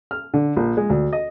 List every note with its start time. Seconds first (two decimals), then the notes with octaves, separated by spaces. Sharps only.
0.11 F6
0.34 D3
0.56 A#1
0.77 G#3
0.90 D2
1.13 D#5